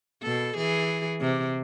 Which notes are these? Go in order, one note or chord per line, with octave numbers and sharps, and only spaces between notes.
B2 A4
E3 G#4
C3